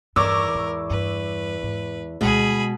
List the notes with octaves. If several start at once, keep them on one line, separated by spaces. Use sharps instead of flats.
E2 G2 D#3 A#4 C#6 D6 E6
G#2
G2 B4
G#2
D2 B2 G3 G#3 G#4 B5